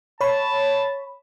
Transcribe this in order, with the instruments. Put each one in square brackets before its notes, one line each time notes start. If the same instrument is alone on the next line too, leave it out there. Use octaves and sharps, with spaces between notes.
[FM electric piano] C#5 B5 [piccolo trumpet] A5